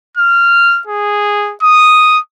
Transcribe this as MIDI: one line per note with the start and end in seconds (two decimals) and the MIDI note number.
0.17 0.82 89
0.87 1.54 68
1.63 2.19 87